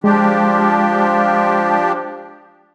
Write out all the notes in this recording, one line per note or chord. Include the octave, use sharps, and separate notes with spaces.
F3 G#3 D4 G4